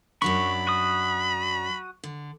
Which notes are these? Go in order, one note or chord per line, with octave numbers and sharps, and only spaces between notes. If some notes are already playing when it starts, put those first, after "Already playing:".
F#2 F#3 D4 B5 C#6
F#4 D#6
D3